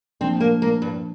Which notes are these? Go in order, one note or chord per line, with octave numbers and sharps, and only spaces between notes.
A#2 F3 C4 D4
A#3
A#3
G2